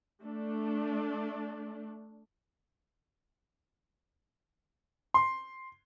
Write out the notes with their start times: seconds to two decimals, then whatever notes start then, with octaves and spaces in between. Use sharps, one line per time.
0.22 A3 D4
5.14 C6